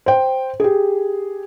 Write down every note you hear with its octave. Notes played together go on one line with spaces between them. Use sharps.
C5 G5
G4 G#4